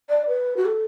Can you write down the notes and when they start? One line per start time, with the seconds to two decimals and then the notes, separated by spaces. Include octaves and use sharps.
0.09 D5
0.28 B4
0.57 F#4
0.65 A4